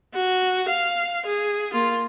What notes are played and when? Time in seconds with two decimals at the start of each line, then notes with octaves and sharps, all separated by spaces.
0.14 F#4
0.69 F5
1.26 G#4
1.73 A#3 F4